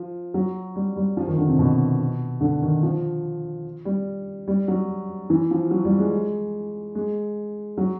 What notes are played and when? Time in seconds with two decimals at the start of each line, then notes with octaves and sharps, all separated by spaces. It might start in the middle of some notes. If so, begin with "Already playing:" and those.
Already playing: F3
0.34 F#3
0.76 G3
0.96 G3
1.17 F3
1.27 D#3
1.38 D3
1.48 C3
1.59 B2
2.41 D3
2.62 D#3
2.83 F3
3.85 G3
4.48 G3
4.68 F#3
5.30 E3
5.51 F3
5.71 F#3
5.85 G3
5.99 G#3
6.95 G#3
7.77 F#3